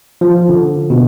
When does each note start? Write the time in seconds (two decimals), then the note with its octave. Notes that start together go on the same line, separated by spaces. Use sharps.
0.21 F3
0.49 D3
0.90 B2